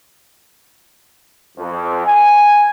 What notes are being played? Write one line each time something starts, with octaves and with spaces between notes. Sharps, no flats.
F2
G#5